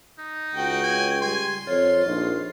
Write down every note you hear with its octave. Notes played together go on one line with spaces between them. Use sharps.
D#4
C#2 F#4 G5
C#4 G#5
G3 G#5 C6
F2 F4 C#5
A#1 D#4